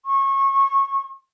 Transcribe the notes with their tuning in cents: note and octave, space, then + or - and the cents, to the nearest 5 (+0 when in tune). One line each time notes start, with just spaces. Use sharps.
C#6 -25